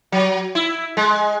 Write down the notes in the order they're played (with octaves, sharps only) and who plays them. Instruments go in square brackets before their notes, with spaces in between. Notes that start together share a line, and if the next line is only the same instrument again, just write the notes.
[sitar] F#3
E4
G#3